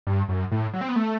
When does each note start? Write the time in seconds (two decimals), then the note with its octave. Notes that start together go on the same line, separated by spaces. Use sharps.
0.07 G2
0.29 F#2
0.51 A2
0.74 F#3
0.81 C4
0.89 B3
0.96 A3